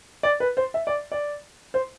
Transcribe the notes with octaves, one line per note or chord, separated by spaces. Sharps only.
D5
B4
C5
E5
D5
D5
C5